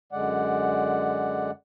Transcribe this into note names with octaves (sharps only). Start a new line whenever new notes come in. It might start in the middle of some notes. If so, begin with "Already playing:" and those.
F#2 D3 G#3 D5 F#5